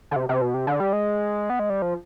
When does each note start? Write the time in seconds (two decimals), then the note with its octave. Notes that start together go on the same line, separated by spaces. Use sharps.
0.11 D3
0.16 C3
0.29 C3
0.42 B2
0.54 C3
0.67 D3
0.80 G3
0.93 G#3
1.50 B3
1.59 G#3
1.70 G3
1.82 F3